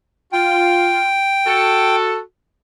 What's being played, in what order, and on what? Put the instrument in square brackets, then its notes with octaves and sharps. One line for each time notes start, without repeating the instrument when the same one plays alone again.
[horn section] F4 [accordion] G5
[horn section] F#4 A4